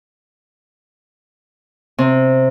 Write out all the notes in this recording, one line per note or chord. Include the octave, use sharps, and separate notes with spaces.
C3